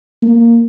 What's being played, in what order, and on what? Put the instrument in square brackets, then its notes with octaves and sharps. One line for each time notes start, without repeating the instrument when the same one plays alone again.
[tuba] A#3